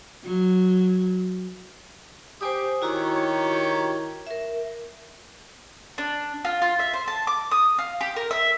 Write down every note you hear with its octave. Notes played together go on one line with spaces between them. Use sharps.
F#3
G4 C5 G#5 D#6
D#3 E4 F#4 G4 C#5 A#5
A#4 E5
D4
F4
F4
E5
C5
A5
D6
D#6
F5
G4
A#4
E5